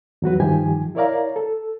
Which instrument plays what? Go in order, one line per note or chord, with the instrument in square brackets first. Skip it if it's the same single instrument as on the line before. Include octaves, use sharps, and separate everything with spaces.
[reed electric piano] E2 F#3 F#4 B4
G2 D#3 F3 G4 G#5
E4 A#4 C#5 D5 F5 A#5
A4